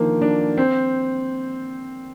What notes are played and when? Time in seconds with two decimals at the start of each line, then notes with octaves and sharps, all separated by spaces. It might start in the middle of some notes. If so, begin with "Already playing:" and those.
Already playing: D3 D#3 F3 A#3
0.22 D4
0.58 C4